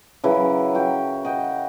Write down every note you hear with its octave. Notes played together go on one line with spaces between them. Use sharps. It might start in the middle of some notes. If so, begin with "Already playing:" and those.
C#3 E3 F#3 A#4
F#4 G5
D#5 F#5 G5